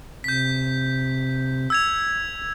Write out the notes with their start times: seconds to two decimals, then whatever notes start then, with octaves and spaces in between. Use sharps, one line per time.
0.24 C3 G6 B6
1.70 E6 G#6 F7